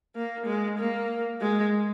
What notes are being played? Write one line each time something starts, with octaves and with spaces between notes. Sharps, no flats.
A#3
G#3
A#3
G#3